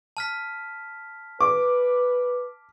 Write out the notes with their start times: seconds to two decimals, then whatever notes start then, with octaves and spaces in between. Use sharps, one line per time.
0.17 A5 F6 B6
1.41 B4 D6